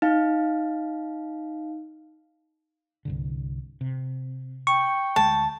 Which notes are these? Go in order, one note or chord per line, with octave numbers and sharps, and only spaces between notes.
D#4 F5
C2 G2 D3
C3
G5 C#6
D2 G#3 A5